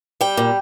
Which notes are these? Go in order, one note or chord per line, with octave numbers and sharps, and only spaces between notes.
G3 G5
A#2